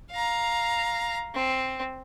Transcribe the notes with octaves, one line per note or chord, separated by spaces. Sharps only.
F5 A#5
C4